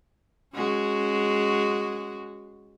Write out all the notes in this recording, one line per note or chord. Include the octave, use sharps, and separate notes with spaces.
G#3 C#4 F#4